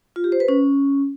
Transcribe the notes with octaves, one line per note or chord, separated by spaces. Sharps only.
F4
G4
C5
B4
C#4